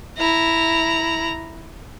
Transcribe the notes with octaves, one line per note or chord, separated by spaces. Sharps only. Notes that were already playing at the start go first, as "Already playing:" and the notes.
E4 A#5